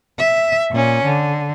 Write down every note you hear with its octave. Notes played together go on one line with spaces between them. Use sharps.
E5
A#2 C#4
D3